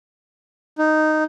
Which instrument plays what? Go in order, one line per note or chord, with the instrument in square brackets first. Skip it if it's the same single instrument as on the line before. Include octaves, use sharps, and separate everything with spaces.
[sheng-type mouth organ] D#4